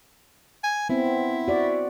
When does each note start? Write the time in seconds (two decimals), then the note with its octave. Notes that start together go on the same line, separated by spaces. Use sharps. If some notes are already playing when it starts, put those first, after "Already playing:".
0.64 G#5
0.89 B3 C4 E4
1.48 F#4 D5